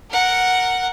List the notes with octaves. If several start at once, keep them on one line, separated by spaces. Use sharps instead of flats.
A#4 F#5